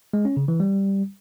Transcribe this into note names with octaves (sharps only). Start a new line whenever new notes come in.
G#3
C#4
C#3
E3
G3